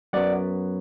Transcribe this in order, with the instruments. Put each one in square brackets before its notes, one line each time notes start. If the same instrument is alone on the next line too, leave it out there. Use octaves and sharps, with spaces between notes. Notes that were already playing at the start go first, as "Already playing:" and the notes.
[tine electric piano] F#2 F#3 B3 D5 F#5